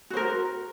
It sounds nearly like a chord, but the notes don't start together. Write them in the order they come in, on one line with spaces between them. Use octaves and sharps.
F#4 C5 A#4